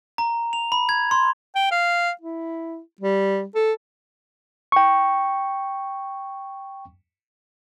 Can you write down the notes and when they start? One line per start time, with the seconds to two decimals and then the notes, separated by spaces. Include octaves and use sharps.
0.18 A#5
0.53 F7
0.72 B5
0.89 G#6
1.11 C6
1.55 G5
1.72 F5
2.21 E4
3.01 G3
3.55 A4
4.72 G5 C#6